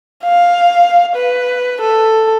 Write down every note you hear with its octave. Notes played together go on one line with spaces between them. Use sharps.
F5
B4
A4